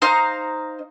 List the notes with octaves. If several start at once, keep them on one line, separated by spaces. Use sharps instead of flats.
D#4 C5 F5 A#5